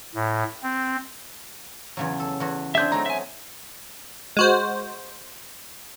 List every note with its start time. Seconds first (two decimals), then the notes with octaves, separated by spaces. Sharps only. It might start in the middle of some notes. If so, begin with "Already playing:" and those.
0.15 A2
0.63 C4
1.97 E2 C#3 F#3
2.20 A4
2.40 E2 F#4
2.75 C4 D4 G#4 E5 G6
2.92 F#3 A3 D#4 A#5
3.06 E5 G#5
4.37 G#3 F#4 C5